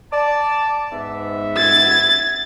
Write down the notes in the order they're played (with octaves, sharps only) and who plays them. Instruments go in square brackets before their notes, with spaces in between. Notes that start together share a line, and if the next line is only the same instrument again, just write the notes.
[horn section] D5 A5
G#2 B3 E5
[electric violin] G#6 A6